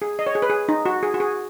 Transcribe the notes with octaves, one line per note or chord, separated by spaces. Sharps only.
G#4
D#5
C#5
G#4
B4
G#4
D#4
F#4
G#4
F#4
G#4